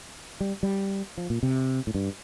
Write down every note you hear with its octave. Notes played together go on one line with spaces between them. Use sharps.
G3
G3
F3
A#2
C3
A2
G2